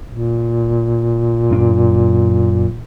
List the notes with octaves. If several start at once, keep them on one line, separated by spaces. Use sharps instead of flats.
A#2
F#2 D4